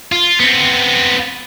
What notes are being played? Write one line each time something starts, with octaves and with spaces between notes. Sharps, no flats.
F4
B3 C4